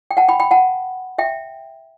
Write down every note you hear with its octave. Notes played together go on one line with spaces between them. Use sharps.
G5
F#5 A5
G5 B5
G5 B5
F#5 A5
E5 G5